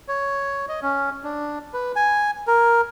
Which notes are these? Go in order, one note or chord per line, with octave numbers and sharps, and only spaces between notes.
C#5
D#5
C#4
D4
B4
G#5
A#4